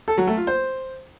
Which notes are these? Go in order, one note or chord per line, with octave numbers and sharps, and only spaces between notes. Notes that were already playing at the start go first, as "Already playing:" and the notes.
A4
F#3
A3
F4
C5